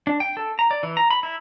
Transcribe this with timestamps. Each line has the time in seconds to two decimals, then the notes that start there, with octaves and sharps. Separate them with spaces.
0.07 D4
0.20 G5
0.37 A4
0.59 A#5
0.71 D5
0.83 E3
0.97 A#5
1.11 B5
1.23 E4